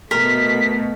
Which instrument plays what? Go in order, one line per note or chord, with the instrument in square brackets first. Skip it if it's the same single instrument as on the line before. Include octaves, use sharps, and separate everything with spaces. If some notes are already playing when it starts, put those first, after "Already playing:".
[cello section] B2 A3 [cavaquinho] A#4 [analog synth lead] B6